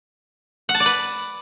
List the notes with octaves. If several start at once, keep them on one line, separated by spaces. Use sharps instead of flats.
F#5
A5
D5
B4